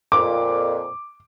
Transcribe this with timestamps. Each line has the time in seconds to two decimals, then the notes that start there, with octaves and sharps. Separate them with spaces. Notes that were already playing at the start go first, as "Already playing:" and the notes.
0.12 F2 A#2 D6